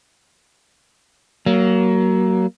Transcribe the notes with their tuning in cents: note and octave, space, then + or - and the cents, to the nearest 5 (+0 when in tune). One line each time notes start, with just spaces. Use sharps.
F#3 +25 A#3 +0